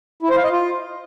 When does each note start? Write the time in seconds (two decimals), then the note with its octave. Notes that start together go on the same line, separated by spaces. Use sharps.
0.23 E4
0.30 C5
0.37 F5
0.44 D#5
0.51 F4